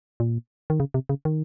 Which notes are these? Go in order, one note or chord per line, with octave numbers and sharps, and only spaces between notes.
A#2
D#3
C#3
C3
C#3
D#3